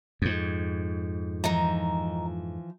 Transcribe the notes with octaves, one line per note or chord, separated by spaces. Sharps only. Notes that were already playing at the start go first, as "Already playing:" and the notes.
F2 G#2
E3 F3 D#4 A#5